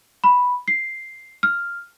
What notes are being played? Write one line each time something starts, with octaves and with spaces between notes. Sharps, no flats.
B5
C7
F6